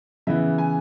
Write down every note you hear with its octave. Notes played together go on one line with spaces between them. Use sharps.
C#3 E3 B3 E5
G#5